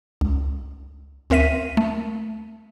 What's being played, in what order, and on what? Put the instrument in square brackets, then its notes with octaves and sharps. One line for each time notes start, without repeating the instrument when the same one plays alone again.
[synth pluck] C#2
D2 C4 A#4 E5 B6 D#7
A3